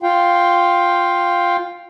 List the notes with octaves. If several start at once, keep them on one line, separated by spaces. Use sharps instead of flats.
F4 F5 G5